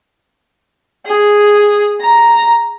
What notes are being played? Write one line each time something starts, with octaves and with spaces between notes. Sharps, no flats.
G#4
A#5